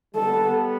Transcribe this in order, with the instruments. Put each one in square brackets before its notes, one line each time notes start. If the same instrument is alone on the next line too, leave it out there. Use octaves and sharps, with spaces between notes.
[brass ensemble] G3 B3 [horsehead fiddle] A4